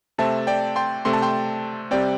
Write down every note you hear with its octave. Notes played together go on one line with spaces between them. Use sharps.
C3 A3 C4 E5 A5
D5 G5
G5 C6
C3 A3 C4 C6
A5
G5 C6
C3 G3 C4 D5 G5